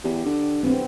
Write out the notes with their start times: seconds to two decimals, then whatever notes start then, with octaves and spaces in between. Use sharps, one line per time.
0.04 E2 G4
0.26 D3
0.63 D1 B3 C4